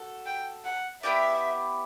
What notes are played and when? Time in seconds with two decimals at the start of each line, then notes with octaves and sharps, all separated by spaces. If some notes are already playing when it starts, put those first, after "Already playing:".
Already playing: F#4 A4
0.26 G5
0.65 F#5
1.03 B3 E4 G4 D5 E5